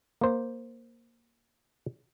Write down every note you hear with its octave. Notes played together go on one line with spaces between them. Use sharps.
A#3 C5